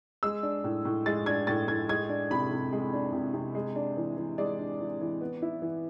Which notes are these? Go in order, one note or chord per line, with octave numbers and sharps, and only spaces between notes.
G#3 E6
D4
A2
A2
G#3 A6
D4 G#6
A2 A6
A2 G#6
G#3 G#6
D4
C3 B5
C3
G#3
D4
C3
C3
G#3
D4
E3
E3
G#3 D5
D4
E3
E3
B3
E4
E3